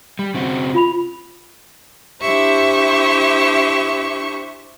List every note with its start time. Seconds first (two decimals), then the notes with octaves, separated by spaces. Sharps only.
0.19 G3
0.34 C#3 C4 F#4
0.74 F4 B5 F7
2.21 D4 E4 G4 C5 E5 C#6